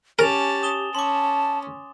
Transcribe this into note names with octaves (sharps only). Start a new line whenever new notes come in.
C#4 G4 A#4 G#5 A5 A6 F7
D#6 E7 G7
C#4 A5 C6 D6